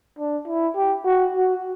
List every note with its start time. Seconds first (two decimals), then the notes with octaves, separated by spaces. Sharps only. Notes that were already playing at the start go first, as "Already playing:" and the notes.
0.18 D4
0.48 E4
0.76 G4
1.05 F#4
1.34 F#4